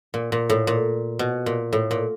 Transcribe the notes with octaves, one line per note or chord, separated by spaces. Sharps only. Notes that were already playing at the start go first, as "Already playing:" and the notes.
A#2
A#2
A2
A#2
B2
A#2
A2
A#2